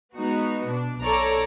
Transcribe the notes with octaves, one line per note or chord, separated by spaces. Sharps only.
G#3 B3 D#4 F#4
B2 D4
B1 A4 C#5 D5 A#5